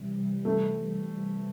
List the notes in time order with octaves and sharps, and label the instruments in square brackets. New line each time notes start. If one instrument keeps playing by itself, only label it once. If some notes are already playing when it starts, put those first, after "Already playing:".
Already playing: [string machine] C3 E3 G3
[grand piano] A3